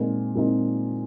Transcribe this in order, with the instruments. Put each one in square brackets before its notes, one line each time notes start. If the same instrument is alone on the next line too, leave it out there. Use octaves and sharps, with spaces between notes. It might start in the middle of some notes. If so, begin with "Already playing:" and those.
Already playing: [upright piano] A#2 G#3 C4 D#4
A#2 G#3 C4 D#4